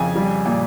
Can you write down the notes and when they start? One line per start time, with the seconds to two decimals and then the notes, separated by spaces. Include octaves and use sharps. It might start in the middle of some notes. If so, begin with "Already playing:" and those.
Already playing: F2 C#3 G#5
0.16 G3
0.45 A#2